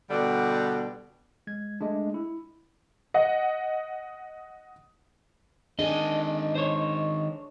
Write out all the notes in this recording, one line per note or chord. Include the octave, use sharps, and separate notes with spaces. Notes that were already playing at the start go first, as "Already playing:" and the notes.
B2 D3 G3
G#3 G#6
G#3 A3 D4
E4
D#5 F#5
D#3 G#3 D4 G#4 D#5
C5 C#5